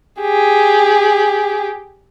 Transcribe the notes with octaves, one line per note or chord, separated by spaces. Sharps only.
G4 G#4